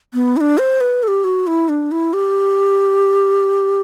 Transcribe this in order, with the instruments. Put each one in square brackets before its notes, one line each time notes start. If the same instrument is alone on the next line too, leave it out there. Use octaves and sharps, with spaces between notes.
[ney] B3
E4
D4
C5
B4
A4
G4
F#4
E4
D4
E4
G4